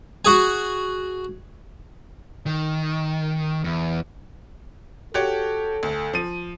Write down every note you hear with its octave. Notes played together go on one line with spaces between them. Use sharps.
F#4 G#4 G#5
D#3
E2
F#4 G4 A4 C#5
D2
F3 D#7